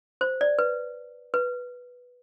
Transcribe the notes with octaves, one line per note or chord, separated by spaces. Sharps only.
C5
D5
B4
B4